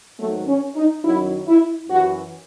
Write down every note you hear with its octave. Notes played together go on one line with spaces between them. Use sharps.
G#2 D#3 F#3 A3
C#4
D#4
F#2 D#3 F#3 E4
E4
F#2 E3 F#4